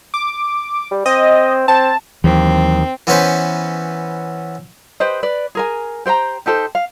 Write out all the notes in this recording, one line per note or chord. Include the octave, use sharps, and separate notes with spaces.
D6
G3
C4 D#5
C4 A5
D#2 E3 F#3 C4
E3 B3 C#4 B4 C5
G4 B4 C5 D#5
B4 D5
G#4 A#4 G#5
G4 C5 G5 A#5
D#4 G4 A4 C5
F5